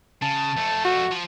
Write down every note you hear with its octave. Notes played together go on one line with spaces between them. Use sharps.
C#3 A5
F2 A3
F#4
F3